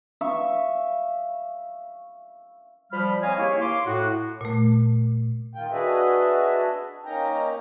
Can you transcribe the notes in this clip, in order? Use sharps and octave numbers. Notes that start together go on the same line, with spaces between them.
E5 F5 C#6
F3 G3 B5 F6
C4 C#5 D#5 F5 G#5
D#3 A#3 E4 G4 G#4 C#5
F5 C6 D6
A2 F#4
A#2 A3
D#3 F4 G5
D4 F#4 G#4 B4 D#5 E5
A#3 C#4 D#4 G5 A#5